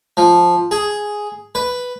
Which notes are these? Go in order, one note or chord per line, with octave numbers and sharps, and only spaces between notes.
F3
G#4
B4